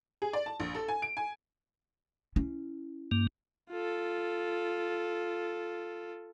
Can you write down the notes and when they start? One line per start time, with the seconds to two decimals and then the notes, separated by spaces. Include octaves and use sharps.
0.22 G#4
0.33 D5
0.46 A5
0.60 A#1
0.75 A4
0.88 G#5
1.02 D7
1.17 G#5
2.36 C#4 E4
3.11 G2 A#3
3.70 F4 A4